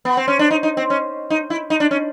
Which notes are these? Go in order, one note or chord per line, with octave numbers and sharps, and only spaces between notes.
B3
C4
C#4
D4
D#4
D#4
C4
C#4
D#4
E4
D#4
D4
C#4